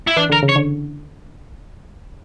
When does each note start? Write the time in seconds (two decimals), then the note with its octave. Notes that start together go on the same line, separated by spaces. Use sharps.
0.07 E4
0.17 E3 D4
0.30 D3 A#4
0.43 C#3
0.49 C#5
0.56 D3